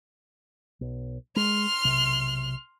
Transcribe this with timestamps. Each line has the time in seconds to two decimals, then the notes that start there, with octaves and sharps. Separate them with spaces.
0.81 B1
1.36 G#3 C6 F6
1.84 B1 C3